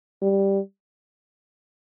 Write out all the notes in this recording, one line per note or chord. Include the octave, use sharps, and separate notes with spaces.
G3